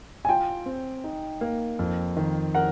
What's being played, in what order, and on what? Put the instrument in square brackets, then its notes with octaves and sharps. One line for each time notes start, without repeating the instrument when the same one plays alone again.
[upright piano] G#5
[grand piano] F4 [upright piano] G5
[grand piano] C4
D#4
A#3
F2
D#3
[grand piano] A#4 [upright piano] F#5